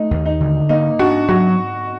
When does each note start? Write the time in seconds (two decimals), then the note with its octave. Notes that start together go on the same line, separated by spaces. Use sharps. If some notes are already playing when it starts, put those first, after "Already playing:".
Already playing: A3 D#4
0.11 D#2
0.26 D#4
0.40 D3
0.69 A#3 D#4
0.99 D4 F#4
1.29 F#3 F#4